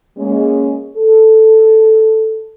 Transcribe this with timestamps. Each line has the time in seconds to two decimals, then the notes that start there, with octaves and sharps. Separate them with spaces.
0.17 G#3 A#3 C#4
0.97 A4